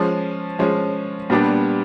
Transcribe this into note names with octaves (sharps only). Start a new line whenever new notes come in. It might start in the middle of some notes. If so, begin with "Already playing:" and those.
Already playing: F3 G#3 C#4
F3 G#3 C#4
A#2 G3 B3 D4 G4